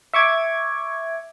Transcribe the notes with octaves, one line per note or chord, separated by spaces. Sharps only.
E5 C#6 D6 G#6